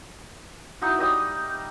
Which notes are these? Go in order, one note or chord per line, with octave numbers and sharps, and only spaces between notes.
D#4 E4 F#4
G3 D#5 G5 D#6